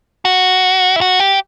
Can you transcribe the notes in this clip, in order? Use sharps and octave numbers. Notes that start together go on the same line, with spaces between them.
F#4
E4
F#4
G4